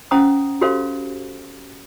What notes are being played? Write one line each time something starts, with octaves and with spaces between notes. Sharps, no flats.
C#4 C5 F#5 A#5 D#6
F#4 G4 A4 C5 F5